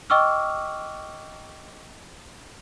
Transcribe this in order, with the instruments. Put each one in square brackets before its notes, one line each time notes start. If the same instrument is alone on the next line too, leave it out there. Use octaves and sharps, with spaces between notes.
[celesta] D#5 G5 C#6 D6 E6 F6